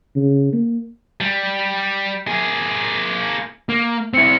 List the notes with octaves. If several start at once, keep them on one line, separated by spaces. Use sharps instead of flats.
C#3
A#3
G3
A#3 G#4
A#3
C4 E4 C#7